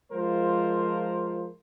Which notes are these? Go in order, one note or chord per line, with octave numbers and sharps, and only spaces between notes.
F3 G#3 F4 A#4 C5